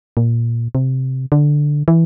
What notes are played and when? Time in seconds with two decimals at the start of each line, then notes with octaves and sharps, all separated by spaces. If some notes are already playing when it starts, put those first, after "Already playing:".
0.17 A#2
0.75 C3
1.32 D3
1.88 E3